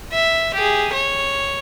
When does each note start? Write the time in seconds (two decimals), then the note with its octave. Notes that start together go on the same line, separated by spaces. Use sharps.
0.12 E5
0.54 G4 G#4
0.93 C#5